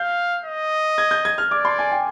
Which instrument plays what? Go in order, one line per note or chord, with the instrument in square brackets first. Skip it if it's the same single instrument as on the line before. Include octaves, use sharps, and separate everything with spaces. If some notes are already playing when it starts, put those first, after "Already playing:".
Already playing: [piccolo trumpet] F5 [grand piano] G6
[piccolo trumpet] D#5
[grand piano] G#6
G6
G#6
F6
[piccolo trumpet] D5 [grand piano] D6
[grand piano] C6
G#5
G5